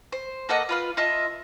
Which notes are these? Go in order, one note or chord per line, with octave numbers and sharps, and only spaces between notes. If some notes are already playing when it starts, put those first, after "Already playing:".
C5
A#3 A4 D#5 F#5
F4 B4 F5
F4 D#5 E5 A5